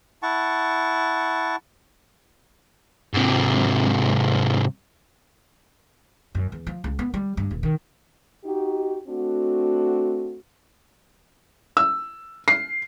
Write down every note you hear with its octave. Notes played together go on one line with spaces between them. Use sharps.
E4 F#5 A5 C#6
G#2 C3
F#2
E2
F3
C#2
B3
G3
G2
D#1
D#3
D#4 F#4 G4
A3 C4 D4 F#4
E6
C7